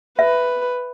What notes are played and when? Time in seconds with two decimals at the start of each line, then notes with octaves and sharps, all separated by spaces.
0.19 B4 E5